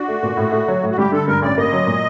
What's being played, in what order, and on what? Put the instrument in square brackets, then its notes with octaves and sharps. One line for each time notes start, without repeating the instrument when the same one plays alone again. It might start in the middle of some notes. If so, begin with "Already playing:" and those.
Already playing: [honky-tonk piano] D4 [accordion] F#4
[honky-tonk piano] A3
A#2
A2
A3
F#3
A2
[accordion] F#4
[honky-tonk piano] G3 [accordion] G4
[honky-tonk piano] D3 [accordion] A4
[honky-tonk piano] G2 [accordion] A#4
[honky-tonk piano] A1 [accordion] D5
[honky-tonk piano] A#3 [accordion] D#5
[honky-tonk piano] F#3
A#2